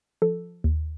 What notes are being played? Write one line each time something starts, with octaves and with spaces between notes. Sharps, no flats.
F3 A4
D#2